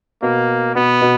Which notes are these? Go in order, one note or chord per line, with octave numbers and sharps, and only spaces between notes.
B2 A#3
B2 B3
B2